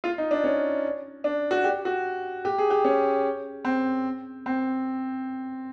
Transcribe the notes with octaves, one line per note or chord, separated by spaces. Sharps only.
F4
D#4
D4
C#4
D4
F#4
G4
F#4
G4
G#4
G4
C#4
C4
C4